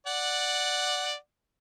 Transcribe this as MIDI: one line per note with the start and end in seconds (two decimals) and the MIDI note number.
0.07 1.14 74
0.07 1.14 78